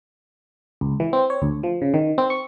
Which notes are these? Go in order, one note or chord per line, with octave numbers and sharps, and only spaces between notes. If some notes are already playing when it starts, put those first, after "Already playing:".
C#2
E3
C4
C#5
D2
F3
C#3
D#3
C4
C#6